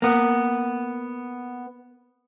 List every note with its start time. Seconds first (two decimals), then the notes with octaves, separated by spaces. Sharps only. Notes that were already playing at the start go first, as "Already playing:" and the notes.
0.02 A#3 B3